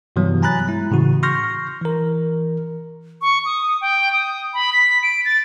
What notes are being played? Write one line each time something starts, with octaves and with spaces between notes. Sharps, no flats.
G2 C3 E3 F#3 G3 B3
G#5 A#5 B5 F#6 A6
G#3 E4
A2 C#3 E3 F#4
C6 C#6 F6 G6 A#6
E3 A#4
C#6
D#6
G5
D#6
B5
B6
D7
A6